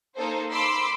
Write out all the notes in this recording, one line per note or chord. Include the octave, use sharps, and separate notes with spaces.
A#3 D#4 A4 C5
B5 C6 D6 E6